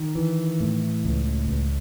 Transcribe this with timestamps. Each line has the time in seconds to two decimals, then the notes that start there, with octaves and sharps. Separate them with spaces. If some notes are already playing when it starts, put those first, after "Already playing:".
Already playing: D#3
0.15 E3
0.60 A2
1.05 C#2
1.48 C#2